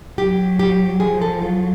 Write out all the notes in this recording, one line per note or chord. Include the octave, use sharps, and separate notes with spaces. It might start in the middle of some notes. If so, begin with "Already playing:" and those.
F#3 G4
G4
F3 G#4
A4
F#3 F4